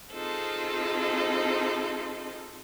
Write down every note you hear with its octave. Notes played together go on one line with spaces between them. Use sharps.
C4 D#4 F4 G#4 A4 C5